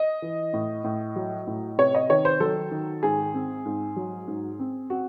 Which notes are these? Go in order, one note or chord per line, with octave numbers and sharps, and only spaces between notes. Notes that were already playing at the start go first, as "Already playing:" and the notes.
Already playing: D#5
E3
A2
A2
F#3
A2
C3 C#5
D#5
D#3 C#5
C5
F#3 A4
D#3
G#2 G#4
C4
G#2
F#3
G#2
C4
C4 F#4